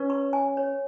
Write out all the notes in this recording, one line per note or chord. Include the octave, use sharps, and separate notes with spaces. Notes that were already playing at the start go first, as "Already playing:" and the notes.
Already playing: C#4 B4
C#6
G#5
C#5